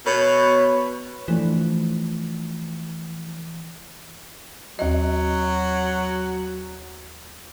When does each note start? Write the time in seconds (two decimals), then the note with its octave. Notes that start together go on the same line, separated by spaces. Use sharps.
0.06 B2 B4 C#5
1.28 E3 F3 A3 D4
4.79 D#2 F#3 D#5